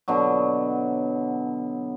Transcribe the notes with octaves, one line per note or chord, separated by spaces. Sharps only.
B2 D3 F#3